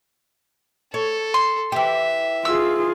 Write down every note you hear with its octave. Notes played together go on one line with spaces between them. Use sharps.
A4 C#5
C6
E3 G4 E5
F4 G#4 E6